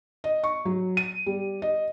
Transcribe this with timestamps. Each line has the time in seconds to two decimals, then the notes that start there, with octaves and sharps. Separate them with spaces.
0.24 D#5
0.44 C#6
0.65 F#3
0.97 D#7
1.26 G3
1.62 D#5